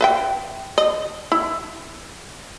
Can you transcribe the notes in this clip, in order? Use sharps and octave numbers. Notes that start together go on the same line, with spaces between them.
B4 E5 G5
D#5
E4